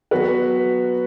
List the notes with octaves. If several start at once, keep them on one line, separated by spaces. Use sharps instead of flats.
F#3 B3 F#4 B4